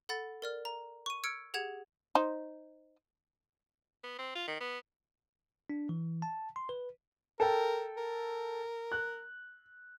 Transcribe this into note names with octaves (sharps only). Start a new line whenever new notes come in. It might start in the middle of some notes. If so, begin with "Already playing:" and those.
A4 F#5 B5 A6
A#4 D5 F6
A#5
C#6 D#7
E6 F6 G#6 C#7 D7
G4 G#4 F#5 G#6 E7
D#4 C5
B3
C4
F4
D#3
B3
D4
E3
A5
C6
B4
A4 A#4 G5
A#4
F#6